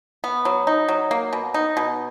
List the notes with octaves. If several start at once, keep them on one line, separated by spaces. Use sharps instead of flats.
B3
F#3
D#4
F#3
A#3
B2
D#4
B2